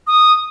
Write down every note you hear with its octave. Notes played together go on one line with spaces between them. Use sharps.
D#6